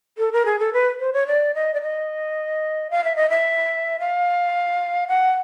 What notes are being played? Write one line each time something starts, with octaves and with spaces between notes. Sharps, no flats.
A4
A#4
G#4
A4
B4
C5
C#5
D5
D#5
D5
D#5
F5
E5
D#5
E5
F5
F#5